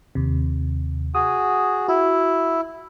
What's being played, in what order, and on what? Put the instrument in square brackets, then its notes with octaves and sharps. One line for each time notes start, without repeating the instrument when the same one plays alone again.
[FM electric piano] D#2 C3
[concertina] F#4 G#4 [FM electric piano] D#6
[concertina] E4 [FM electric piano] F#4